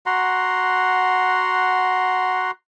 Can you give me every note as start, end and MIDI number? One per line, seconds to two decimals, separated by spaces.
0.06 2.51 66
0.06 2.51 78
0.06 2.51 82
0.06 2.51 84